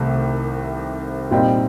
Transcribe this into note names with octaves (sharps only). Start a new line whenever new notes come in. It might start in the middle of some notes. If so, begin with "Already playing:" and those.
Already playing: C2 C3 D#3 A3
A#2 G3 C4 D#4